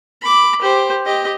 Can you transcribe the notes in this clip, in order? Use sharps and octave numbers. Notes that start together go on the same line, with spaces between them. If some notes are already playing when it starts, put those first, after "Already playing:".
B5 D6
G4 C5
G4 D#5